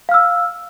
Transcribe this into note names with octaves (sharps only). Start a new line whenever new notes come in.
F5 E6 F6